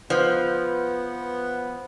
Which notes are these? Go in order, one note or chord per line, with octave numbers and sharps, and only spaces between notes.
F3 B3 B4 C5